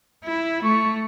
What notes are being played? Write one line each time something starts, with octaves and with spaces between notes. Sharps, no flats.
E4
A3 C#6